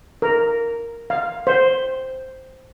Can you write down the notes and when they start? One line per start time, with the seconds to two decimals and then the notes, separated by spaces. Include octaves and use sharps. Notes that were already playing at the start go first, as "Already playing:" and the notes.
0.22 A#4
1.10 F5
1.47 C5